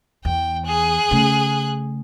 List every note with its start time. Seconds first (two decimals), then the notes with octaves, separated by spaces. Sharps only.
0.25 E2 G5
0.66 G#4 F#6
1.11 C#3 A3